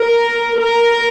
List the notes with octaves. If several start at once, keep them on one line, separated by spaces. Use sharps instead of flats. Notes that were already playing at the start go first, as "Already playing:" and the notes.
Already playing: A#4
A#4